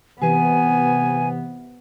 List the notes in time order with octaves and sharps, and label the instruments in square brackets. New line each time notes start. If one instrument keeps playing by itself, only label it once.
[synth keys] C3 E3 [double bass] B3 [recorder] G#5